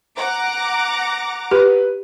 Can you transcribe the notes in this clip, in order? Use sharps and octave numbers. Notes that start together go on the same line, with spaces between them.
F#5 A#5 D6
G4 B4